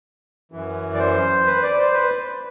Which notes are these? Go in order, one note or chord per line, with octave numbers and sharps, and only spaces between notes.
F#2 E3
D5
C5
B4
D5
C5
B4